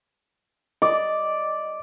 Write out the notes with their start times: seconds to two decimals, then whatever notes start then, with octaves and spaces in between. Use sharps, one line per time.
0.82 D5 D#5